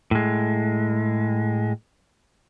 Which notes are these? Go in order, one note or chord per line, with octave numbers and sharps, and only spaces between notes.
A2 G#3